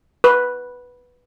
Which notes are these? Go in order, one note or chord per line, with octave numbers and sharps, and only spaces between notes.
B4